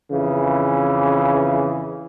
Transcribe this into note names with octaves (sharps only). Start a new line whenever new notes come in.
F2 C#3 E3